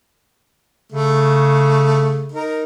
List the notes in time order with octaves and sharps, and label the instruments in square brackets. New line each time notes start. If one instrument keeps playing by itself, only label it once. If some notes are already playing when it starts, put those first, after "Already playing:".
[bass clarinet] C#3 [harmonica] A3
[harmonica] D#4 A#4